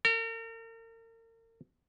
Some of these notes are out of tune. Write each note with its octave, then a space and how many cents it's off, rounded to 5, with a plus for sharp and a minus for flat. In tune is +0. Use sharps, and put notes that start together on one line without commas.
A#4 -40